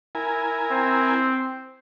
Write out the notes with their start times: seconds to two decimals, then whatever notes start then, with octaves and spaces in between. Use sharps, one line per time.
0.15 E4 A#4 G#5
0.71 C4